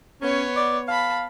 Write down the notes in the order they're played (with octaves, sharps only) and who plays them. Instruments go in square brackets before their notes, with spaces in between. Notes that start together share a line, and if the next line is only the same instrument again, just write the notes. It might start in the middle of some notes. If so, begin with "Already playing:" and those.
[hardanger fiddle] B3 C#5 [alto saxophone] C#4
[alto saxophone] D5
[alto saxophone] F5 [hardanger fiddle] A5 B5